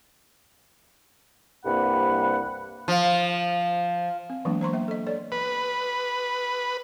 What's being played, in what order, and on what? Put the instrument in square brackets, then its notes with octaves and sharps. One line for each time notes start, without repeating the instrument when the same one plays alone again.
[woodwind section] C2 G2 C3 A#3 F#5 B5
[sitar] F3
[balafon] C4
E3 F#3 G#3 A#3 B3 D4
C5 A#5 C6 C#6
A#3 B3 E5
A4 D#5
A4 C#5 D5
[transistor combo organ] B4